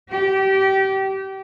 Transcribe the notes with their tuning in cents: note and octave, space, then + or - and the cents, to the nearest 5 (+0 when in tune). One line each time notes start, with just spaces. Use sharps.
G4 -25